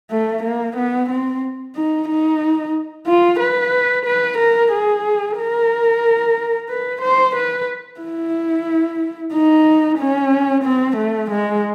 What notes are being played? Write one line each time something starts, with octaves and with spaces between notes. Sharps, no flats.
A3
A#3
B3
C4
D#4
D#4
F4
B4
B4
A#4
G#4
A#4
B4
C5
B4
E4
D#4
C#4
C4
A3
G#3